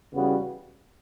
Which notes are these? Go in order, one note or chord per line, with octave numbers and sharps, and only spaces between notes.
E2 C#3 G3 B3 F#4